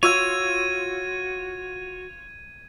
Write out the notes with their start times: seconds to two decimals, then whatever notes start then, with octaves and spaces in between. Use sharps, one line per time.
0.03 F4 F#4 C#5 E6 G#6 D#7